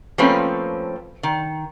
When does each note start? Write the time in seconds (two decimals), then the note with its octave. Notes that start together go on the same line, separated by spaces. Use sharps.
0.18 F3 A3 A#3 C4 C#4 B4
1.23 D#3